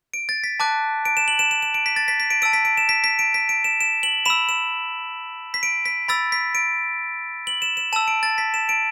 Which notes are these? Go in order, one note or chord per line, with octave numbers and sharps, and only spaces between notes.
D7
A6
B6
A5 D6 F#6
D7
E7
F#7
E7
E7
E7
D7
B6
A6
B6
B6
D7
A5 E6 D7
B6
D7
E7
B6
B6
D7
B6
D7
E7
E7
F#7
B5 E6 E7
E7
B6
D7
B6
B5 E6 A6
B6
D7
F#7
E7
E7
A5 E6 E7
D7
A6
B6
E7
D7